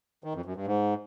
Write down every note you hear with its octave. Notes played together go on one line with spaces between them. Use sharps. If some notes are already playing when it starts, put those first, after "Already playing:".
D#3
F2
F#2
G2
G#2